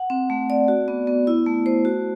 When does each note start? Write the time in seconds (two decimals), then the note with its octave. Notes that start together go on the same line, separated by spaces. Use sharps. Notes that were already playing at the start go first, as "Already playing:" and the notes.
Already playing: F#5
0.10 C4
0.30 A3
0.50 D5
0.68 F#4
0.88 B3
1.07 B3
1.27 E4
1.46 A3
1.66 C5
1.85 F#4